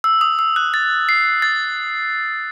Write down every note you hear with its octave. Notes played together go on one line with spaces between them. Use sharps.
E6
D#6
E6
F#6
A6
C7
A6